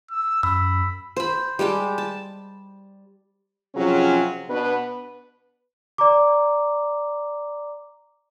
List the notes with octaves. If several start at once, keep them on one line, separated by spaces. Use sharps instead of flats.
E6
F#2 B5 E6
C5 B5
G3 G#3 G4 A5
A5
C3 F3 F#3 C#4 F4 G#4
B2 D4 B4
D5 A#5 D6